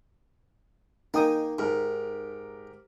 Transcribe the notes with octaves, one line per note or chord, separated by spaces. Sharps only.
A#3 D#4 G5 D#6
G#2 G4 A#4